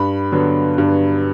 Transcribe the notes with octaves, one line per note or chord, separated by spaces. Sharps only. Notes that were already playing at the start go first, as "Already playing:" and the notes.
Already playing: G2 B5
D3 F#3 B3
G2